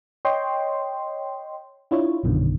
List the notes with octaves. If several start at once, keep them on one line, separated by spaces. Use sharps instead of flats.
C#5 D#5 G5 C6
D4 E4 F4 C#5
A#1 F#2 B2 D3 D#3